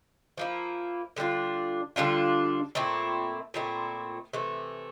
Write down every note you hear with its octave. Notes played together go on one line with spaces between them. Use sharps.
F3 A#3 E4
D3 G3 D4 F4
D3 G3 D4 F4
A#2 A3 C4 E4
A#2 A3 C4 E4
C3 E3 A3